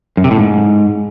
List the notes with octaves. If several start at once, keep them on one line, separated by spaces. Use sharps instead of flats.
F#2
C3
A2
G#2